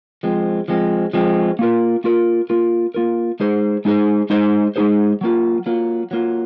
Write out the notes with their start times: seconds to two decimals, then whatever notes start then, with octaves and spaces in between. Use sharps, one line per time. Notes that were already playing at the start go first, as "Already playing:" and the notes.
0.23 F3 G#3 C4
0.68 F3 G#3 C4
1.13 F3 G#3 C4
1.59 A#3 F4 A#4
2.04 A#3 F4 A#4
2.50 A#3 F4 A#4
2.94 A#3 F4 A#4
3.40 G#3 D#4 G#4 C5
3.85 G#3 D#4 G#4 C5
4.30 G#3 D#4 G#4 C5
4.76 G#3 D#4 G#4 C5
5.21 F#3 A#3 F4
5.66 F#3 A#3 F4
6.11 F#3 A#3 F4